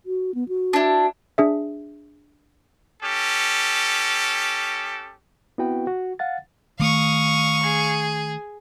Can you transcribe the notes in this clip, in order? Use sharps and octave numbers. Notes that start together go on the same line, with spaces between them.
F#4
B3
F#4
D4 E4
D4 G#4 E5
C#4 G4 A4
B3 C4 E4 F#4 B4 G5
F#4
F5 F#5 A6
D#3 A3 F5 C#6 D#6
G#4